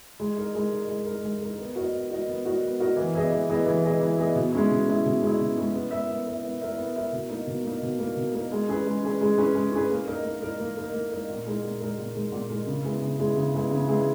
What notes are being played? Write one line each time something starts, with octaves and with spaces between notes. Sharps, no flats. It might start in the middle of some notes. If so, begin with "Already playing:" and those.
G#3
D#4 A#4
G#3
D#4 A#4
G#3
D#4 A#4
G#3
D#4 A#4
B3
F#4 A#4 D#5
B3
F#4 A#4 D#5
B3
F#4 A#4 D#5
B3
F#4 A#4 D#5
E3
B3 E4 G#4 D#5
E3
B3 E4 G#4 D#5
E3
B3 E4 G#4 D#5
E3
B3 E4 G#4 D#5
B2
G#3 C#4 E4
B2
G#3 C#4 E4
B2
G#3 C#4 E4
B2
G#3 C#4 E4
B3
E4 A#4 E5
B3
E4 A#4 E5
B3
E4 A#4 E5
B3
E4 A#4 E5
B2
A#3 D#4
B2
A#3 D#4
B2
A#3 D#4
B2
A#3 D#4
G#3
C#4 G#4 B4
G#3
C#4 G#4 B4
G#3
C#4 G#4 B4
G#3
C#4 G#4 B4
A#3
D#4 A#4
A#3
D#4 A#4
A#3
D#4 A#4
A#3
D#4 A#4
A#2
G#3 D#4 A#4
A#2
G#3 D#4 A#4
A#2
G#3 D#4 A#4
A#2
G#3 D#4 A#4
C#3
G#3 B3 E4 G#4
C#3
G#3 B3 E4 G#4
C#3
G#3 B3 E4 G#4
C#3
G#3 B3 E4 G#4